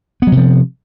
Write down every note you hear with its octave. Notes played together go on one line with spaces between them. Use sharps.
C3 F3 F#3 B3